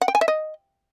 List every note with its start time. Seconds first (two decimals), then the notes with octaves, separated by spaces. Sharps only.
0.01 F#5
0.08 G5
0.15 G#5
0.21 E5
0.28 D#5